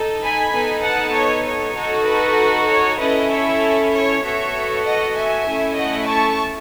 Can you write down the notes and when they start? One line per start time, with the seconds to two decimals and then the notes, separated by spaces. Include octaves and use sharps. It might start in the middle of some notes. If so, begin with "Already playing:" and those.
Already playing: D#4 A4
0.22 G#5 B5
0.53 B3 D#4 A4
0.84 F#5 A5
1.15 C#5
1.46 C#5
1.77 D#4 F#4 A4
2.08 B4
2.70 C#5
3.00 C#4 E4 A4 B4 D#5
3.32 C#5 E5
3.93 C#5
4.24 B3 F#4 A4 C#5 E5
4.86 D#5 F#5
5.17 E5 G#5
5.48 A3 C#4 E4
5.79 D#5 F#5
6.09 A5 C#6